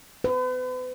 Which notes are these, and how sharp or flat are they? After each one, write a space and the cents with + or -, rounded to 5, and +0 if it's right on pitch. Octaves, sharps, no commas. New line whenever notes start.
B4 +40